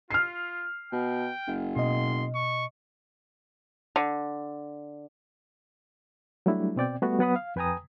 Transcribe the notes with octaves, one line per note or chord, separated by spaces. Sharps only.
F4 F6 C7
B2 G5
F#1
B2 D#5 C6
C#6
D3
F#3 G3 A3 D4 E4
B2 C4 D5 G5
G3 A3 B3 F#4
F#3 B3 F#5 B5 D#6
F5
F2 B4 G5 G#5 A#5 D#6